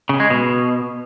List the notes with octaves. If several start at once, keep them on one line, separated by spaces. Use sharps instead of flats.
C#3
G#3
B2